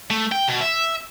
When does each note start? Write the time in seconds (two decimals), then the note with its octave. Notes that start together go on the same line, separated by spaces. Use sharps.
0.10 A3
0.32 G5
0.48 B2
0.61 E5